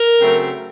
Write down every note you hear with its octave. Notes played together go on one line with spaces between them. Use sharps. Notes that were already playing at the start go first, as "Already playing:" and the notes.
Already playing: A#4
C#3 F#3 A3 C4